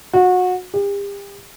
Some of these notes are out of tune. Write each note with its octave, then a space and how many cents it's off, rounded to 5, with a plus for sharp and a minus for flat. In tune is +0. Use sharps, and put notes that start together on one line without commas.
F#4 -25
G4 +40